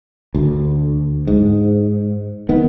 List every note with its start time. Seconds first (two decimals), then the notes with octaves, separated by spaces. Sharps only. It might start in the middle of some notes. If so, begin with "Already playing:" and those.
0.35 D2
1.27 G#2
2.49 D#3 B3